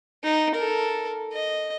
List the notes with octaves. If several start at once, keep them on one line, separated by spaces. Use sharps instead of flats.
D#4
A4 A#4
D#5